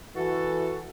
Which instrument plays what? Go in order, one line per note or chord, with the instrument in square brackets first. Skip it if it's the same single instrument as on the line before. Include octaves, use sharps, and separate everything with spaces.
[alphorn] E3 [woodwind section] F#4 A4